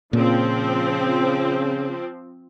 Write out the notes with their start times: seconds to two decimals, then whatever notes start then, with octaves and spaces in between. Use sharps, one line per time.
0.13 A#2 C#3 F3 C4